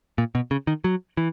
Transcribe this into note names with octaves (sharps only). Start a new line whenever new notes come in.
A#2
B2
C#3
D#3
F#3
E3